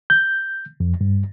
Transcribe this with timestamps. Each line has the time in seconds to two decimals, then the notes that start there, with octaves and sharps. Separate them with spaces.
0.10 G6
0.80 F2
1.01 G2